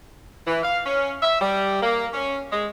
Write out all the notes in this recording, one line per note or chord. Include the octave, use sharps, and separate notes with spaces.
E3
F5
C#4
E5
G3
A#3
C#4
G#3